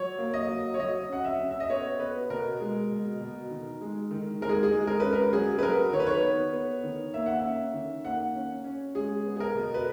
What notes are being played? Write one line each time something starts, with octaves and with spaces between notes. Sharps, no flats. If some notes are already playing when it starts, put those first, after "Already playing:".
Already playing: F#3 C#5
A#3
D#5
F#3
C#5
F#3 D#5
C#4 F#5
E5
C#4
E5
D#5
B3 C#5
B3 B4
B2 A#4
G#3
B2
B2
D#3
G#3
D#3
G#3 A#4
G#4
G#4
G#3
A#4
C#4 B4
A#4
F#3 G#4
B4
F#3 A#4
D#3 C#5
B4
C#5
B3
B3
D#3
A#3 E5
F#5
E5
C#4
D#3
A#3 F#5
C#4
C#4
G#3 G#4
B3
G#4
A#4
B2
B4